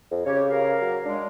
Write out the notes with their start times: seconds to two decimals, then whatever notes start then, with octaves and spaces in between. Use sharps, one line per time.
0.11 F2
0.26 C#3 C#4 G4 C#5
0.50 A#4 F5
0.81 F#3
1.05 G#3 D4